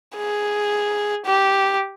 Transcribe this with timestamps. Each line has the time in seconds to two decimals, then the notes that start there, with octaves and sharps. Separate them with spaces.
0.16 G#4
1.26 G4